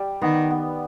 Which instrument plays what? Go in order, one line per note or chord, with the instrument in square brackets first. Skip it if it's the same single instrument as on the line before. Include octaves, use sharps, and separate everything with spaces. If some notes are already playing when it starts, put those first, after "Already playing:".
Already playing: [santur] G3
[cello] D#3 [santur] B3
[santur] B3